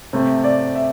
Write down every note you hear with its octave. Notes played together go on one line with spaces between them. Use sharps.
C3 A3 C4
D5
E5